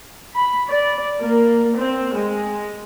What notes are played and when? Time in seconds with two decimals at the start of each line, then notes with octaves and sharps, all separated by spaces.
0.34 B5
0.69 D5
1.19 A#3
1.76 C4
2.14 G#3